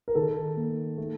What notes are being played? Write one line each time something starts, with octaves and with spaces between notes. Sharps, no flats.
A#4
D#3 A4
A#3
A3